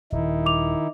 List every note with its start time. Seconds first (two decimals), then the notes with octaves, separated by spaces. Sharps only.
0.12 D#1 D#3 D#4 E4
0.46 D6 F7